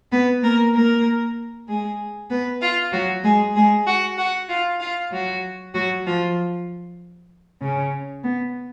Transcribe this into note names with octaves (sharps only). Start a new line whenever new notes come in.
B3 B4
A#3 A#4
A#3 A#4
G#3 G#4
B3 B4
F4 F5
F#3 F#4
G#3 G#4
G#3 G#4
F#4 F#5
F#4 F#5
F4 F5
F4 F5
F#3 F#4
F#3 F#4
F3 F4
C#3 C#4
B3